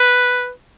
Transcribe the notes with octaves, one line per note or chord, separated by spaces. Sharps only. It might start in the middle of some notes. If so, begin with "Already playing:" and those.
Already playing: B4